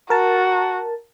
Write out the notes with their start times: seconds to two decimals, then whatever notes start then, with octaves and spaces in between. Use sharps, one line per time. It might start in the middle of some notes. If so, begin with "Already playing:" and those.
0.10 F#4 A#4 A5